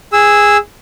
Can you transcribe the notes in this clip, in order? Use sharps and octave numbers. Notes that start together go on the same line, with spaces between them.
G#4 E6